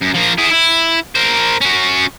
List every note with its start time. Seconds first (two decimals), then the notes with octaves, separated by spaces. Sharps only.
0.01 F#2
0.14 F3 A#4
0.38 E4 G#4
0.51 E4
1.15 A#4 C5
1.61 C#4 F#4